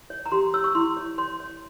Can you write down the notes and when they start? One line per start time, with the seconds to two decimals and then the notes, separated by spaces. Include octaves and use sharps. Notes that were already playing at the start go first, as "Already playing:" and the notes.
0.10 C#5
0.26 A#5
0.32 G4 C6
0.54 C#5 E6
0.64 C#6
0.75 E4 C6
0.97 C#5
1.18 C#5 C6
1.40 C#5